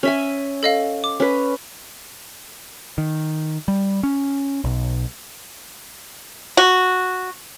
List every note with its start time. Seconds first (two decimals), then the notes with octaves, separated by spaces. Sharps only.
0.03 C#4 E5 G#5
0.63 A4 D#5 F5
1.04 D6
1.20 C#4 B4
2.98 D#3
3.68 G3
4.03 C#4
4.64 B1
6.57 F#4